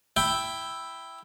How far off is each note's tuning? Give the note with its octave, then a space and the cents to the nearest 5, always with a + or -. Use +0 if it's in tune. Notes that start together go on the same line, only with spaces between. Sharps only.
E4 +0 G5 +0